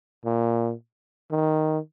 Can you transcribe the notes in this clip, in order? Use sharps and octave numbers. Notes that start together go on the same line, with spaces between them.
A#2
D#3